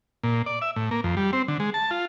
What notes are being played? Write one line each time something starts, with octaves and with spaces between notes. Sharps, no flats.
A#2
D5
E5
A2
A#3
F2
G3
C4
D3
G#3
A5
F4